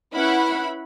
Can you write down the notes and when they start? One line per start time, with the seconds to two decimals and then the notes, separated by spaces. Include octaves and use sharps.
0.14 C#4 E4 B4 F#5 B5